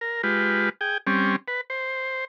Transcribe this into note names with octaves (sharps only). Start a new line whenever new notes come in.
A#4
G#3 F4 G4 B4
G#4 G5
G3 C4 C#4
B4
C5